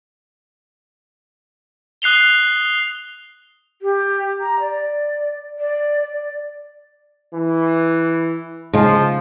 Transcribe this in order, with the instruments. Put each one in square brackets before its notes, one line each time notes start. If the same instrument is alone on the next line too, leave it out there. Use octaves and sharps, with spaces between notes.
[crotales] D#6 F#6 C7 F7 G7
[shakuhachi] G4
A#5
D5
D5
D5
[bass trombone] E3
[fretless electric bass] G#2 C#3 G#3 [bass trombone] F3